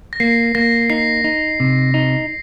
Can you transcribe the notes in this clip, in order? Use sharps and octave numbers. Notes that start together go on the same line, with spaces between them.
A#6
A#3 C7
A#3 A#6
D#4 C7
D#4
C3
D#4